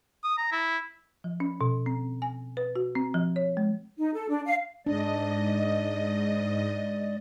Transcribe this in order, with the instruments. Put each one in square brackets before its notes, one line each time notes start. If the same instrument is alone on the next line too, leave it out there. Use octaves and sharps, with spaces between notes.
[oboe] D#6
A#5
E4
[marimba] F3
C#4
B2
C4
G#5
B4
F#4
C4
F3
C#5
G#3
[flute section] D#4
A4
D4
F5
[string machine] G#2 D#5 [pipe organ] G#3 D5 [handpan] D4